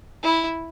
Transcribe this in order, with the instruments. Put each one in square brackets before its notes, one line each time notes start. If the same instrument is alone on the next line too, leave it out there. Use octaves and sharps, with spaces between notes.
[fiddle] E4